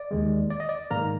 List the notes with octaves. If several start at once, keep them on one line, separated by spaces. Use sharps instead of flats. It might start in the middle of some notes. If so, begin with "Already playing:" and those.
Already playing: D5
D#2 D#3 G#3
D5
D#5
D5
G#2 D#3 A#3 A#4 A#5